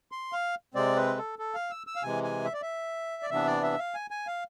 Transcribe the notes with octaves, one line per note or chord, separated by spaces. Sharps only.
C6
F5
C3 G#3 C4 D5
B4
A4
A4
F5
E6
E6
F5
C3 E3 G#3 G#5
G#5
E5
D5
E5
D5
C3 E3 B3 D4 E5
D5
E5
F5
G#5
G#5
F5